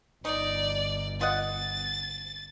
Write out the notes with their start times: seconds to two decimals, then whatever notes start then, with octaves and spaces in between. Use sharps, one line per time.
0.25 G1 D#4 D5
1.21 F4 D#5 F#5 A6